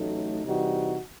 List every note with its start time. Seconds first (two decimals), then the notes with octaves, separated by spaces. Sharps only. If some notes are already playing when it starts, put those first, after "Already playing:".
Already playing: A1 A2 F#3 A3 D#4
0.44 C3 E3 G3 D#4 F#4